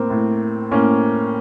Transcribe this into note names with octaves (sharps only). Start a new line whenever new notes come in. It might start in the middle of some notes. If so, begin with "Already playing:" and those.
Already playing: A2 A#3 C4
A2
A2 A#3 C#4